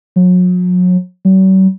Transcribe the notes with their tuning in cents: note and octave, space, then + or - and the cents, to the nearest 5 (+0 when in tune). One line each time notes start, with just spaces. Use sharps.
F#3 -35
F#3 +45